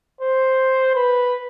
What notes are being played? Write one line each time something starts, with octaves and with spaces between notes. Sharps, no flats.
C5
B4